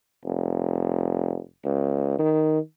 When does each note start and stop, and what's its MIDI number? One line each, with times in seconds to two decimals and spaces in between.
0.25 1.40 29
1.65 2.16 37
2.19 2.59 51